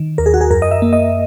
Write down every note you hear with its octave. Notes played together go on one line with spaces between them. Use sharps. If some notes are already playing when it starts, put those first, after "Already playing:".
Already playing: D#3
D#2 A#4
G#4
F#4
G#4
F#2 A#4
D#5
E5
A#3
D#5